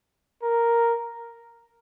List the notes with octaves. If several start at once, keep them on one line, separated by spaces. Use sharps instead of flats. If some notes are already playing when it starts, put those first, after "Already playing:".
A#4